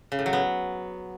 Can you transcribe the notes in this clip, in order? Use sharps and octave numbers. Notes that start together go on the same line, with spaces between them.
C#3
A2
F#3
B3